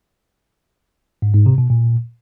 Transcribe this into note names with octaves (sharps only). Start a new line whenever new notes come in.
G#2
G#2
C3
B2
A#2